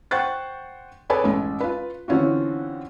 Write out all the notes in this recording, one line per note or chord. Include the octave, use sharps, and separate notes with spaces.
C5 F#5 G5 C#6 F#6 A6
G#4 A4 B4 C#5 D5 G#5
A1 G#3
F4 B4
D3 E3 C4 C#4 F4 F#4